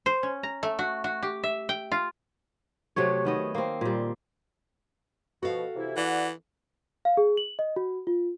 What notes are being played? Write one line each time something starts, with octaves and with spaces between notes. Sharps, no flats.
C5
C#4
A#5
A3
F#4
F#4
G4
E5
G5
F4
C3 F#3 A3 C#5
D#3 B3 D#5
A#3 C4
A#2 G3
B2 F3 F#4 A4 F5
C3 E3 E4
E3 D5 F#5
F5
G#4
F#7
D#5
F#4
F4